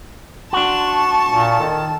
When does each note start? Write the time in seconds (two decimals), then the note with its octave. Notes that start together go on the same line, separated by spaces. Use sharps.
0.53 D4 F#4 A5 C6
0.87 C#6
1.28 A#2
1.60 D#3 A4